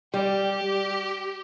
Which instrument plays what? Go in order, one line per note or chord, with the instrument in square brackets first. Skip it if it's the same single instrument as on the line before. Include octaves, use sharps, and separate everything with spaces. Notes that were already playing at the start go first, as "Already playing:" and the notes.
[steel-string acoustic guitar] G3 [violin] G4